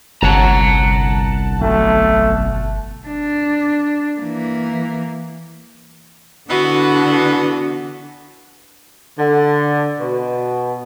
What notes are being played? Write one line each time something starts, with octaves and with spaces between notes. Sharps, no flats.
G1 C2 F#5 A5 A#5 F#6
B1 F2 A3
D4
E3 A#3
D3 E3 B3 F#4
D3
B2